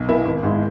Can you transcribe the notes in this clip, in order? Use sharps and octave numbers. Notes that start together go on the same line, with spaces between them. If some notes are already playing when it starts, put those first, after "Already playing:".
Already playing: B1
B2 B3 E4
G#1
G#2 G#3 E4